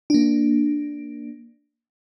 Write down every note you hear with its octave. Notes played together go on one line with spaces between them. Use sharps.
A#3 D4